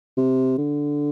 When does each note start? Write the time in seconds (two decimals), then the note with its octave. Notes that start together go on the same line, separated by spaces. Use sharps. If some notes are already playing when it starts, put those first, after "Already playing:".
0.17 C3
0.58 D3